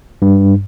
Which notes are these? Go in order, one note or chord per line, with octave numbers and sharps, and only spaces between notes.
G2